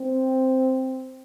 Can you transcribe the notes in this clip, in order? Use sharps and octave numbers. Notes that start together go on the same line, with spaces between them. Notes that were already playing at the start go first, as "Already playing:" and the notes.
Already playing: C4